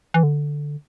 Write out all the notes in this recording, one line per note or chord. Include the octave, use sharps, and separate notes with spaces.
E3
D3